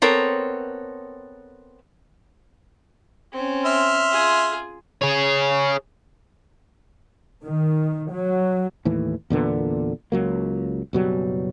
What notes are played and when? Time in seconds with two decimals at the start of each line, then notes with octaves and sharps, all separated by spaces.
0.02 B3 C4 A4 A#4 C#5
3.33 C4 C#4
3.65 E5 C6 F6
4.11 F4 G#4
5.02 G#4 C#5
7.44 D#3
8.12 F#3
8.85 D#2 A2 E3
9.30 E2 A#2 D3 B3
10.12 C#2 F#3 A#3
10.93 F#1 B2 F#3 G3